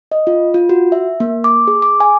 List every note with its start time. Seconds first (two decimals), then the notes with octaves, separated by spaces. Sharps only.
0.12 D#5
0.27 F4
0.54 F4
0.69 F#4
0.92 E5
1.20 A#3
1.44 D6
1.68 G#4
1.82 D6
2.00 G#5